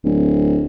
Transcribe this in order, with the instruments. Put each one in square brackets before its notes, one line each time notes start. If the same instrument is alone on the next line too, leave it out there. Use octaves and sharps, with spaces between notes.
[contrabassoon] D1